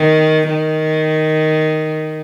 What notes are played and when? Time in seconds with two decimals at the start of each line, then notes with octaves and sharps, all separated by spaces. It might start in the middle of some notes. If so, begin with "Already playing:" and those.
Already playing: D#3
0.49 D#3